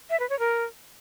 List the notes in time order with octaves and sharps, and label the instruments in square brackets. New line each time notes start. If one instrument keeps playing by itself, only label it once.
[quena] E5
B4
C#5
A#4